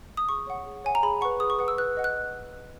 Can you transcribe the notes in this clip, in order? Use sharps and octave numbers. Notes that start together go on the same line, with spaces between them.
D#6
G#4 C#6
C#5 F#5
G#4
C#5 F#5 G#5
A#5
G#4 B5
B4 F#5 C#6
G#4 D#6
C#6
B4 F#5 D#6
E6
B4 F#6
D#5 F#5
F#6